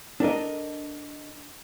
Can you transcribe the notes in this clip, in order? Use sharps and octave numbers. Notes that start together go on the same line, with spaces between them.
D4 A4 A#4 D#5